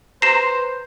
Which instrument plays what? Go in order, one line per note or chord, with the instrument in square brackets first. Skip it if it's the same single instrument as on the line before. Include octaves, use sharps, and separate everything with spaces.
[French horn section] B4 [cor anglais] C5 [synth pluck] A#5 C6 [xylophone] C7 E7